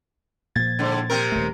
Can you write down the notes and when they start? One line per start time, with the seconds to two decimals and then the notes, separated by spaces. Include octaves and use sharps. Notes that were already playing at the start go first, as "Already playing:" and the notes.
0.56 A#2 F3 G#6 A6
0.79 G#2 D3
1.09 C3 C4 A#4
1.32 D#1 A3